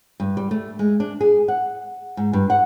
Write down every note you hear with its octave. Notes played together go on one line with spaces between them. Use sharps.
G2
G3
A3
G#3
D4
G#4
F#5
G#2
G2
F#5